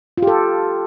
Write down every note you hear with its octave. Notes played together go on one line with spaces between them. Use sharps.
F4 G4 A4